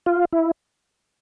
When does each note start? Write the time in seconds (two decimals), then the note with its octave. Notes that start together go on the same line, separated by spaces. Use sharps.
0.06 F4
0.33 E4